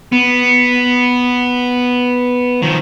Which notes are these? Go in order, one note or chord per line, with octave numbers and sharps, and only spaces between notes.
B3
D#3 F3